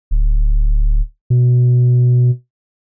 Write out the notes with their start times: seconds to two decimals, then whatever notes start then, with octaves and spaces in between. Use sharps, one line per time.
0.11 D1
1.30 B2